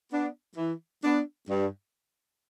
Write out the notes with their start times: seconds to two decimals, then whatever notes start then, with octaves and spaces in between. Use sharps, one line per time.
0.11 B3 D4
0.57 E3
1.03 B3 D4
1.50 G2